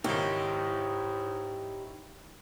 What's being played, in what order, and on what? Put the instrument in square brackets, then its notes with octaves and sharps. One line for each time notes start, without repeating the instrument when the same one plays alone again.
[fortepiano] C#2 D#3 [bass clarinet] G#2 [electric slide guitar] D#4 E4 C#5 [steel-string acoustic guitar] G4